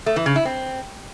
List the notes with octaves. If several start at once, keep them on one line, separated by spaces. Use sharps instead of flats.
A3
E3
C#3
E4
C4